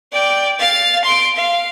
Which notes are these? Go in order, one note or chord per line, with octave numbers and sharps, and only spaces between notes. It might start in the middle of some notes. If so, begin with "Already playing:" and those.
D5 G5
F5 A6
C6 D7
F5